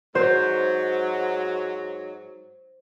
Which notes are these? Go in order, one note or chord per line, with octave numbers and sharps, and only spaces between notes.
G#2 F#3 C5